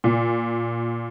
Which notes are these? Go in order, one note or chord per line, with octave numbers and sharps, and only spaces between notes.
A#2